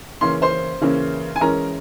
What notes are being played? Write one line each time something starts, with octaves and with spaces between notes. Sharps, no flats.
C#3 E3 A#3 C#4 C6
C5 C6
C#3 E3 A#3 C#4
G#5
E3 G#3 C#4 A#4 A#5